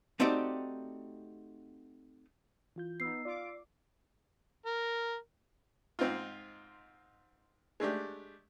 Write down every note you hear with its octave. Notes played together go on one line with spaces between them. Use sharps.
A3 C4 D#4 F#4 G4 D5
E3 F4 G6
B3 D#4 E6 C7
F4 D5 D6
A#4
G#2 C4 D#4 F4
G#3 A3 D4 G4